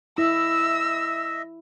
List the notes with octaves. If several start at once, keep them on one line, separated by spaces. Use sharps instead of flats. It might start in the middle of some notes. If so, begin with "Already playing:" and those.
E4 D#5 E5 E6